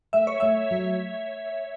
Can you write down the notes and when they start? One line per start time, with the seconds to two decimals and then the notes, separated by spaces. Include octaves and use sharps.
0.13 A3 E5
0.27 C#5
0.40 A3 E5
0.71 F#3